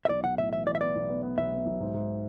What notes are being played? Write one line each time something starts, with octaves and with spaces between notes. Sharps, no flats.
E5
B1 D5
B1 F#5
A2 E5
E3 E5
E3 D5
E5
B3 D5
B1
B3
B3
B1 E5
B3
B1
G#2
G#2